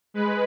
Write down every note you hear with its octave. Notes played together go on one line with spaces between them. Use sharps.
G#3 B4